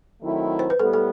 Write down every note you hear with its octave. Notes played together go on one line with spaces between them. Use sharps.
D#3 F#3 A3 C4 E4
C5
B4
A2 G3 B3 A4
A4